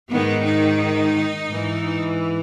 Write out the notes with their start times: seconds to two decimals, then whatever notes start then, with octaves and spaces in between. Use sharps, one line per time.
0.11 G#2 D#3 B3
0.46 D#4
1.48 G#2 E3